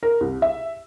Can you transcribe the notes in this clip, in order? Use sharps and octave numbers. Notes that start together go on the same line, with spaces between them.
A#4
C2
E5